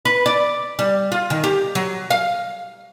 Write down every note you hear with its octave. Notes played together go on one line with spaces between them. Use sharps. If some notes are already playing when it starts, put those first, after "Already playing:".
B4
D5
G3
F4
D#3
G4
F#3
F5